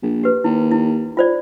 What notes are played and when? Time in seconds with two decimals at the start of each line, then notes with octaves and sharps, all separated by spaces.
0.03 A#1
0.24 G4 B4
0.44 D#2 E4
0.71 E4
1.17 F4 C5 D5